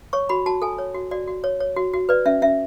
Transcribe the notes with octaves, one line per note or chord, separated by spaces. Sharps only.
C#5 C#6
F#4 B5
F#4 A5
A4 G#5
C#5
F#4
F#4 D5
F#4
C#5
C#5
F#4
F#4
B4 D5
C#4 E5
C#4 E5